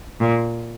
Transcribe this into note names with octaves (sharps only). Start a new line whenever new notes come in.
A#2